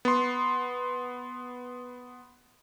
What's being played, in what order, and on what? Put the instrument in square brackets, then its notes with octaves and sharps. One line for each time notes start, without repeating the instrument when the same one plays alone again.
[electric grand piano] B3 C6